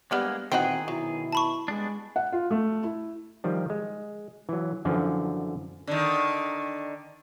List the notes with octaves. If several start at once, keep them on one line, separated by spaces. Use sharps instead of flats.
G3 G#3 A#3 B3 D4 F6
A#2 D#3 E3 C4 D#4 F#4 G#4
B2 F#3 E4
A5 B5 C#6
G3 G#3 B3 D4
F#5
F4
A3
E4
D#3 F3 G3
G#3
E3 F#3
F#2 D3 E3 F3
D3 D#3